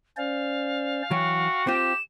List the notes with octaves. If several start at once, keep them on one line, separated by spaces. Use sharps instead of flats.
C#4 C5 D5 F5
E3 F#3 F#4 G5
C4 F4 G4 E7